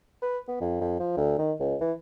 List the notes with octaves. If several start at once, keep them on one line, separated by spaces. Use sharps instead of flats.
B4
B3
F2
F2
F3
D2
D#3
C#2
E3